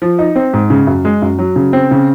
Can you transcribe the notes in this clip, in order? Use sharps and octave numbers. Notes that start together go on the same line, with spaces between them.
F3
D#4
C4
G#2
C#3
F#2
G#3
F#2
F#3
C#3
C4
C#3